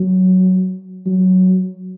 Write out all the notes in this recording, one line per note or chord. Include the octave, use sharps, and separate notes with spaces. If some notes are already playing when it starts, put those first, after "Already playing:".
Already playing: F#3
F#3